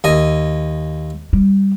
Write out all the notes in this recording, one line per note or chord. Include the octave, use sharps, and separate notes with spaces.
D#2 D#5 G#5
G3